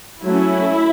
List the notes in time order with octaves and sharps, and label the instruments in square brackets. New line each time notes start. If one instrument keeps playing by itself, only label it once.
[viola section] F#3 A3 C#4 E4